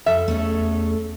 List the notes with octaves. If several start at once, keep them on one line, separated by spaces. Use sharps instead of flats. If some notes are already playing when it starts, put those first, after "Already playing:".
F2 A4 E5
E2 A3 B3 C#4